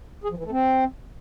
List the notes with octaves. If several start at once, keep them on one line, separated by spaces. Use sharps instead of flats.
G#4
F3
E3
A3
C4